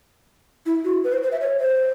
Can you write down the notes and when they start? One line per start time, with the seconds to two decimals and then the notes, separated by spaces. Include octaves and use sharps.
0.66 E4
0.84 F#4
1.04 B4
1.13 C5
1.23 C5
1.32 E5
1.41 C#5
1.60 C5